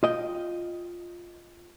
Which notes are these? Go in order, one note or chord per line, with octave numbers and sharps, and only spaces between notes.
F4 D#5 G5